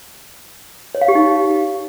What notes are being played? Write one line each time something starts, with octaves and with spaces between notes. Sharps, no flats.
C#5
F5
G4
D#4